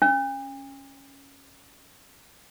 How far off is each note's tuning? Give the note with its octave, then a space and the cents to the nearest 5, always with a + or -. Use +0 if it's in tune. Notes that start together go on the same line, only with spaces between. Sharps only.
C#4 -5